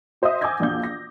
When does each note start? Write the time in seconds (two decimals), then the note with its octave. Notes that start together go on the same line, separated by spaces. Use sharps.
0.22 F#4 C5 D#5 E5 D#6
0.41 G#5 D6 E6 G6 G#6 A#6
0.60 A#1 E2 D4 F5 G6
0.83 A#6